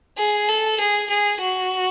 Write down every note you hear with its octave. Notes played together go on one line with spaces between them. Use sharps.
G#4
A4
G#4
G#4
F#4